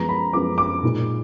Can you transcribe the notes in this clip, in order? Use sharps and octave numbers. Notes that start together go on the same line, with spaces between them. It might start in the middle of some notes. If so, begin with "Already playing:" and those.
Already playing: F#2 F3 G#3 B3 A#5
B5
F#2 F3 G#3 B3 D6
D6
A#2 G#3 D#4